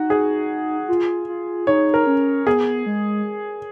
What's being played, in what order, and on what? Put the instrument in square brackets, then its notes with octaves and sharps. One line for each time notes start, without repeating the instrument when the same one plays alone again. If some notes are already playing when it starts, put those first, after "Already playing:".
Already playing: [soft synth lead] D#4 [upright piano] F#4
[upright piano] G#4
[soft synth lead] F4
F4
[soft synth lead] D#4 [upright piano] C#5
[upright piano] A#4
[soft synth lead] C#4
[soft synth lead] B3 [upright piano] G#4
[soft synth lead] G#3